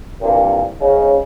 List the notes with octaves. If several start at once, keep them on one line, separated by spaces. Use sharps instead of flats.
C2 G2 A#2
G#2 C#3 C#4 D#4